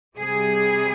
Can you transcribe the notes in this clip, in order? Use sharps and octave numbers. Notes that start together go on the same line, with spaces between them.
C3 G3 G#4